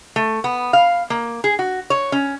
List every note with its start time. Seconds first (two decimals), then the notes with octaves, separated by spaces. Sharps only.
0.16 A3
0.44 B3
0.73 F5
1.10 A#3
1.44 G#4
1.59 F#4
1.90 C#5
2.12 C#4